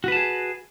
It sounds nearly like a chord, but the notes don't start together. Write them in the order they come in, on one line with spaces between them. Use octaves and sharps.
F#4 B4 A5 G#4